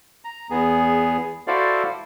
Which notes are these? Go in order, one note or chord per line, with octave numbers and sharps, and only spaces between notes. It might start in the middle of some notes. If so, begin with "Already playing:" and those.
A#5
E2 B3 G#4
E4 F#4 A4 C5 D5 F5